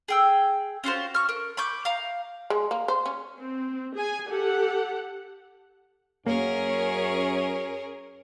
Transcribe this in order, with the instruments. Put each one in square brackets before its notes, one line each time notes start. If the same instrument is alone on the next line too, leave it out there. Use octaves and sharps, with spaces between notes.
[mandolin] G#4 G5 E6
C#4 F4 F#4 C5
C#6 F6
A#4
B5 C#6 D6 G6
F5 A#5
[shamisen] G#3
A#3
C5
C#4
[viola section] C4
G#4 G#5
G4 A4 F#5
[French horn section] F#2 [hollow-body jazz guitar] A#3 [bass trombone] C#4 [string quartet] G#4 A#4 C#5